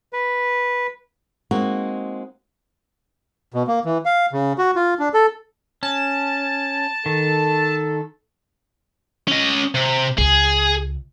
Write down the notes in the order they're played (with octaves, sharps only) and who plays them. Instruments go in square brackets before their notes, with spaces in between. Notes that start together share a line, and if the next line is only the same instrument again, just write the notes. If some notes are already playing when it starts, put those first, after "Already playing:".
[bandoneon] B4
[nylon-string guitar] G#3 A#3 C4 D#4 F#4
[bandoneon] B2
A#3
E3
F5
C#3
F#4
F4
D4
A4
[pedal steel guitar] C#4 [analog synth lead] A5
[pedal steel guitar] D#3 [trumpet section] A4
[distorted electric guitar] C#4 D#5
C3
[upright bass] C#2 [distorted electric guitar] G#4